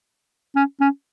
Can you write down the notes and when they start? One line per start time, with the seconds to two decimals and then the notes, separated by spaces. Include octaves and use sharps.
0.56 C#4
0.81 C#4